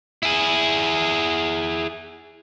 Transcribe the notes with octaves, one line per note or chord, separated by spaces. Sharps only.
E4 G#4